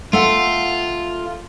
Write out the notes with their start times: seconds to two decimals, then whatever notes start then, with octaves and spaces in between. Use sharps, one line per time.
0.13 A3 F4 F#5